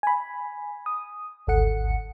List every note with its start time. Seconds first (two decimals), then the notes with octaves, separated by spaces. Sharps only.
0.03 G#5 B5
0.86 D#6
1.47 G#1 D2 A4 F#5 C#7